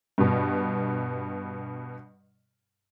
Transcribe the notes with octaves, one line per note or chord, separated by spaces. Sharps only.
G2 B2